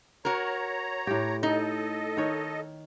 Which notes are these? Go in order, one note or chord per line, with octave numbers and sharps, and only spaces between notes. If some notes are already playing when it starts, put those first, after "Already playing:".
F#4 A#4 C#5 A#5
A2 G4
D#4 A4 D#5
D#3 C#5